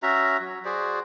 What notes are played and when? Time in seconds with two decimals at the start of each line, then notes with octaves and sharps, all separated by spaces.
0.03 C#4 F#4 E5 A#5
0.40 F#3
0.65 F#4 G#4 C5 D5